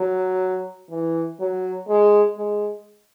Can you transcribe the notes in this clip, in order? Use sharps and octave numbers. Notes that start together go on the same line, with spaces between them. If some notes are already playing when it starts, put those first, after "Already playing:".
Already playing: F#3
E3
F#3
G#3
G#3